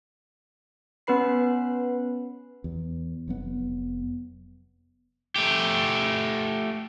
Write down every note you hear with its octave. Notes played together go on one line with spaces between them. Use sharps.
B3 C#4 B4 B5 C7
E2
F1 F#3 B3
A3 G4